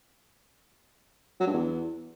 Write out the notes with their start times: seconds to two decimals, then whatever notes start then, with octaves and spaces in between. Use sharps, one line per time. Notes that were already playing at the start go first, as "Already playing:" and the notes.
1.40 F#3
1.47 G2
1.54 E2